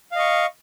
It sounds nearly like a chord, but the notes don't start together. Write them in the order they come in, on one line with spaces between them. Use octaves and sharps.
F5 D#5 C#6